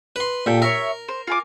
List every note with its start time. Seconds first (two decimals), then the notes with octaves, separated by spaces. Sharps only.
0.16 B4 C6
0.46 A#2 G4 A4 G5
0.62 A#4 C#5 E5
1.08 C5
1.27 F4 G#5 D6